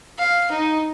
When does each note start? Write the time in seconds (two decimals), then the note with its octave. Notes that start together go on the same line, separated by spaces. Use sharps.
0.18 F5
0.51 D#4